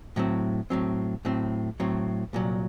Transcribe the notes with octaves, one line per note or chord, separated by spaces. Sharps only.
A2 F#3 C4
A2 F#3 C4
A2 F#3 C4
A2 F#3 C4
C2 A#2 F#3